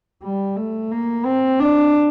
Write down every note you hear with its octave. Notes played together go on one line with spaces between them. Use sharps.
G3
A3
A#3
C4
D4